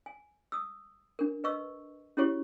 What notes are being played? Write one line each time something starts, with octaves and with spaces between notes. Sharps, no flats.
G#5
D#6 E6
D4 A#4
B4 D#5 C#6 E6
C#4 E4 F#4 G4 C#5 C#6